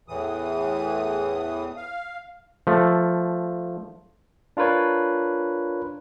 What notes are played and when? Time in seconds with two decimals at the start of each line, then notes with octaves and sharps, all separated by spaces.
0.08 E2 A2 E3 D#6
1.77 F5
2.67 F3 A3
4.57 D4 F4 A#4 B4 C#5